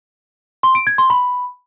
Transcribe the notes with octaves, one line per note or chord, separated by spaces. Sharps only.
C6
D7
G#6
C6
B5